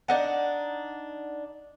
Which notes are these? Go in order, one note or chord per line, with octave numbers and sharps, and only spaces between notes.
D4 D#4 F#5